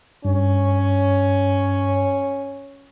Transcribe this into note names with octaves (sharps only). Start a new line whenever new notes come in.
G2 C#4